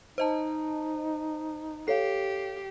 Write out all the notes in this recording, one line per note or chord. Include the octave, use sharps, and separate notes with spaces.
D#4 C5 D#5 A5
G4 A4 C#5 F5 C7